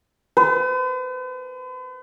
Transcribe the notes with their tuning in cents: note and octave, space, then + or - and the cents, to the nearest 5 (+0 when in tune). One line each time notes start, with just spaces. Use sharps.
B4 +45